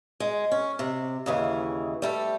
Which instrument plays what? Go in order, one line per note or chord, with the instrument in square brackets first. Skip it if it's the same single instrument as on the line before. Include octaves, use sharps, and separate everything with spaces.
[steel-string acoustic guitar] G#3
C#4
C3
D#2 C#3 E3
G3 A3 A4